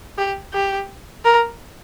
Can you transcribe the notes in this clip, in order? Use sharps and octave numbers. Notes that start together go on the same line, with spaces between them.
G4
G4
A#4